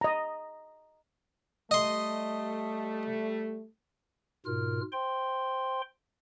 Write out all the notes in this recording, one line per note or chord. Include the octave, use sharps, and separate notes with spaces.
D#5 A#5
G3 A3 D#5 C6
G#2 B2 F4 A#4 F6
C5 G5 C6